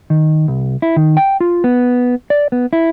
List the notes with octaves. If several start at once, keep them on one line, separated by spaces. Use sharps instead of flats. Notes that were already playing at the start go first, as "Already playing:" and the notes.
D#3
C2
E4
D#3
G5
F4
B3
D5
B3
E4